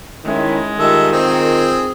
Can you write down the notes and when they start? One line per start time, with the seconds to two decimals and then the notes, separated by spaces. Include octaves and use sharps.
0.25 D#3 G#3 C#4 E4
0.79 D#3 G3 F4 A4 E5
1.12 C4 G#4